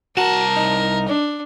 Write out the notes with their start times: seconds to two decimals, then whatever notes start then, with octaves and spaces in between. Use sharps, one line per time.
0.17 C2 F#4 A#4 A5
0.56 D#4
1.08 D4